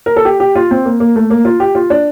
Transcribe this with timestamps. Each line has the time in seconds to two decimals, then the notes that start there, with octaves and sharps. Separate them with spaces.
0.06 A#4
0.16 A4
0.25 G4
0.40 G4
0.55 F4
0.71 C4
0.85 A#3
1.00 A#3
1.16 A3
1.30 A#3
1.45 F4
1.60 G4
1.75 F4
1.90 D4